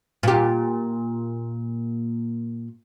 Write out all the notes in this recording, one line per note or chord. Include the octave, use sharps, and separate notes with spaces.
A#2 G4